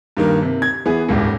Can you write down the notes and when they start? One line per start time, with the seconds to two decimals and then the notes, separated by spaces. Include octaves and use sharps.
0.17 G2 D#3 A#3
0.42 C3
0.62 G#6
0.85 E3 B3 G#4
1.08 D#1 G#1 C#2